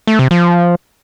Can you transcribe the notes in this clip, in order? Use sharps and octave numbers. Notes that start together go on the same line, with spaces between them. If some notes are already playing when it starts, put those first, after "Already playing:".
A3
C3
F3